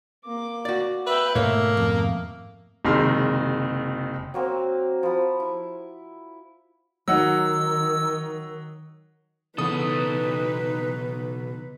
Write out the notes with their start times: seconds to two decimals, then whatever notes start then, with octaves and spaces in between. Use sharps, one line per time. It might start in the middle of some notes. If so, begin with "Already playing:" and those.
0.25 A#3 D6
0.65 F#4 D5
1.07 B4 E5 G5
1.35 G#2 B2 D#3 A3 A#3 C#5 E5
1.77 F2
2.85 F#1 C3 D#3 G#3 C6 F6
4.34 F#3 A#3 C4
5.03 F3 B5
5.40 E4
7.08 D#3 F#3 D#4 F#5 E6
9.58 B1 C#3 E3 B3 D#4 A4 B4 D#6